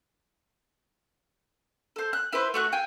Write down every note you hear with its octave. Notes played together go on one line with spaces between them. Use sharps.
A4 C5
F#6
E4 B4 C5
A3 F#4 F#6
F5 G5 G#5